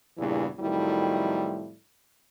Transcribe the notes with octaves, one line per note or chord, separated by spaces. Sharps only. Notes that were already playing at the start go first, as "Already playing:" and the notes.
E2 G2 A#2 C#3 E3
F2 A2 D#3 F#3 G3 E4